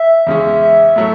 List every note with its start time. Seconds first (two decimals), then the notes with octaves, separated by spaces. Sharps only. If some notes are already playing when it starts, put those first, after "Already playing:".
Already playing: E5
0.27 E2 C#3 G#3 C#4
0.61 E5
0.96 A2 F#3 A3